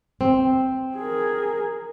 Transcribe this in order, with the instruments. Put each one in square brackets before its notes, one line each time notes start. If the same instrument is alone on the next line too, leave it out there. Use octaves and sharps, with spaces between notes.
[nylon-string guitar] C4
[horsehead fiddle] G#4 A#4